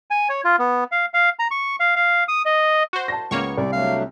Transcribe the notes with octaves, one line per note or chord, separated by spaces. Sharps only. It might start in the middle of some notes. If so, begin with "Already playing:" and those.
G#5
C#5
F4
B3
F5
F5
A#5
C#6
F5
F5
D#6
D#5
F#4 C5
A5 A#6
C#2 A#3 B3 C#5 C#6
C2 D5
F#3 A3 D4 F5